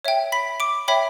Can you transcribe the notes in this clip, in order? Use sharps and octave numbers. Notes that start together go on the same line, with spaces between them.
C#5 E5 G5
B5 B6
D6 D7
C#5 E5 G5 B5 B6